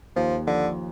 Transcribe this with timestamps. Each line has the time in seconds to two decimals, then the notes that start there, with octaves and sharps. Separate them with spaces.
0.16 D#2 F3
0.47 D3 F3